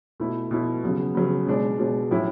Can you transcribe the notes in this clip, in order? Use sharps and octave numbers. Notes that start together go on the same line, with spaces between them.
B2 A3 E4
B2 A3 E4
C#3 F#3 B3
C#3 F#3 B3
B2 G#3 D4
B2 G#3 D4
A2 F#3 C#4 E4